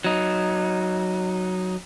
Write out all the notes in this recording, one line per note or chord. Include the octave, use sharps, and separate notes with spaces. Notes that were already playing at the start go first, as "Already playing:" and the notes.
F#3 D#4